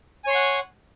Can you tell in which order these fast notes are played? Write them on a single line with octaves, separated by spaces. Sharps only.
G#5 C#5 C6 C#6 F#5